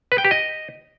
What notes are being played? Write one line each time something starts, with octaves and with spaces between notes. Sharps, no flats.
B4
G5
G4
D#5